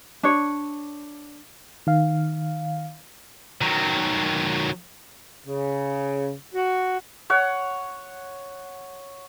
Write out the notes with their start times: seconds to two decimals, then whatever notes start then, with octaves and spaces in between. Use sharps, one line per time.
0.23 D4 C#5
1.87 D#3 F5
3.61 D#3 F#3
5.47 C#3
6.54 F#4
7.30 C#5 F#5